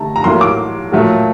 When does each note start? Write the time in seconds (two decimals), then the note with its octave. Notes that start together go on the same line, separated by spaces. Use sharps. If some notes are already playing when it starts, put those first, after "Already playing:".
Already playing: D3 A3 A5 A#5
0.16 A#5
0.24 A2 F#3 A#3 C6
0.41 D6
0.92 A#2 F#3 A3